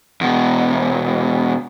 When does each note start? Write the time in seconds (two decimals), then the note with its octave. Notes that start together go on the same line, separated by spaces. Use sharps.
0.21 E2 B2